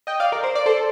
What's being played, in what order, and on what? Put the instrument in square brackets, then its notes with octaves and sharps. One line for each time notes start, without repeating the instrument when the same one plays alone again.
[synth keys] D#5 G5
D5 F5
A#4 D5
C5
D5
A4 C5